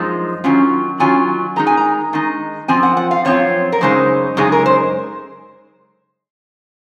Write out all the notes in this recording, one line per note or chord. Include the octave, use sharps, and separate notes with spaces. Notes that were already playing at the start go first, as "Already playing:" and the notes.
Already playing: F#2 F3 G#3 D#4
D#3 F#3 C#4 F4
D#3 F#3 C#4 F4 G#5
D#3 G#3 D#4 A#5
G#5
A#5
D#3 G#3 D#4
F#2 F3 C4 F4 G#5
F#5
F#5
F5
F#2 F3 C4 F4 C#5
A#4
F#2 C#3 G#3 D#4 C5
F#2 C#3 G#3 D#4 G#4
A#4
C5